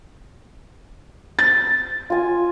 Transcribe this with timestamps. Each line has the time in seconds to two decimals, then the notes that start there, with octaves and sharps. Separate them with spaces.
1.39 A6
2.10 F4 G#5